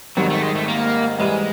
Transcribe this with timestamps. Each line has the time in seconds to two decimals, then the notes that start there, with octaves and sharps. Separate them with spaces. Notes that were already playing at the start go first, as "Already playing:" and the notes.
0.17 G#1 G#2 D#3 F#3 G3
0.30 A3
0.42 G#3
0.55 A3
0.68 A#3
1.19 G#2 E3 G3 G#3